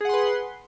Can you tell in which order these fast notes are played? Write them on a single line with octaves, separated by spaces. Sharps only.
G#4 F#5 C6 B4